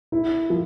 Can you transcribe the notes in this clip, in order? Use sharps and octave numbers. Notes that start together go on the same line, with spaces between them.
E4
F3